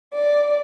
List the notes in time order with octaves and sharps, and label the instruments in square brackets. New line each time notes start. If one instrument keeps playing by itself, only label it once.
[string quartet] D5